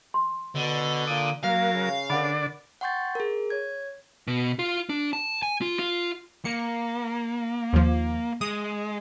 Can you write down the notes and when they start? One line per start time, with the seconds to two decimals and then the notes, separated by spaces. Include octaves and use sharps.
0.14 C6
0.55 B2 D3
1.07 A#2 D6 D#6
1.44 F#3 A#3 A#4 F5
1.73 C#3
2.10 D3 A#4 D5 F#5 B5
2.81 F#5 G5 C6 C#6 G6 A6
3.15 G#4 A#4
3.50 C#5 G#6
4.27 B2
4.59 F4
4.89 D4
5.13 A5
5.43 G#5
5.61 F4
5.79 F4
6.45 A#3 C#7
7.73 D#2 F3
8.41 G#3 D#6